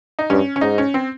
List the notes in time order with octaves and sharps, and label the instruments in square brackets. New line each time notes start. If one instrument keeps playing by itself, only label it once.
[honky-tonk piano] D#4
[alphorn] G2 [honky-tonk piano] C#4
[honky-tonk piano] C#4
[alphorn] G#2 [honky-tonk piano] D#4
[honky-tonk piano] C#4
C4